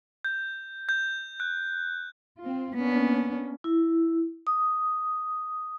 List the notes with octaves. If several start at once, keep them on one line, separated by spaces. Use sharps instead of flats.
G6
G6
F#6
C4 F4
A#3 B3 C#4 D4
E4
D#6